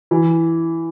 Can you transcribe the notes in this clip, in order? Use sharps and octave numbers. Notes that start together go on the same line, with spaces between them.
E3